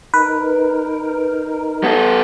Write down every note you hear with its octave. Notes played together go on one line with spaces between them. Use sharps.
D#4 A#4 B4
B3 A4